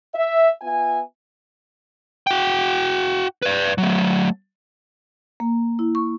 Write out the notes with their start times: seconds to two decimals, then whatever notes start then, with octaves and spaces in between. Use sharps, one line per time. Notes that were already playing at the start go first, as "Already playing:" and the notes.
0.13 E5
0.61 B3 F4 E5 G#5
2.27 F#4 G5
3.42 B4 D5
3.78 F#3 A3
5.40 A#3
5.79 E4
5.95 C#6